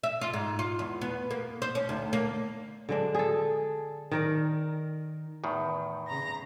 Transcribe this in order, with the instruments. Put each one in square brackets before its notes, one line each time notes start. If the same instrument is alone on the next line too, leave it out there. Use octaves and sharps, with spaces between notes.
[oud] E5
F4
G#2
F4
E2
B3
A#3
C5
C#4
D2
A#3
[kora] D3 G#3 D4
G#4 A4
D#3 A#4 D5
[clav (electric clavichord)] E2 A2 D#3
[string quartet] C#3 A#5 A#6